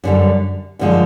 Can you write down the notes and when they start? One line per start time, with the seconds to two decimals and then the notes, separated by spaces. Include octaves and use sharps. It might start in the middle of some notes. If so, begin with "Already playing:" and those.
0.04 F#2 D3 G3
0.79 F#2 D3 F3 G#3